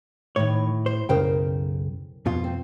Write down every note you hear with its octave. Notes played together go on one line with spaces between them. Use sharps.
A2 D#3 C#5
C5
B1 F#2 C#3 A#4 C5 G5
F2 B2 F4
C4